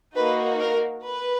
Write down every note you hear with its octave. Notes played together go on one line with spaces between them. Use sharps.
A#3 D#4 F#4 B4
A#4
B4